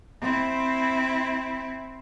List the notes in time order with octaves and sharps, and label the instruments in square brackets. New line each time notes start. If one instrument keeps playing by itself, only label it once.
[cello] C4 E4